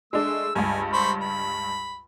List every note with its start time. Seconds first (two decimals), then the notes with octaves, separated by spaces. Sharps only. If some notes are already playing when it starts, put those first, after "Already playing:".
0.13 G#3 A3 D4 E6
0.55 C#2 G2 G#5
0.93 C5 B5 C#6
1.21 B5